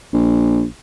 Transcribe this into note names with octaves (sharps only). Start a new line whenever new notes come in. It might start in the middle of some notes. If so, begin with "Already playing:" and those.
A#1